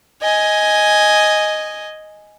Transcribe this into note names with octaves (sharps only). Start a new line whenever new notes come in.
D#5 G#5